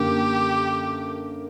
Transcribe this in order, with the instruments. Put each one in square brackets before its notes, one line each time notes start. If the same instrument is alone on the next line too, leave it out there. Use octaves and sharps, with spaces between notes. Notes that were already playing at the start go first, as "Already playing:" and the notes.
Already playing: [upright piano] F#2 D3 A#3 [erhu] G4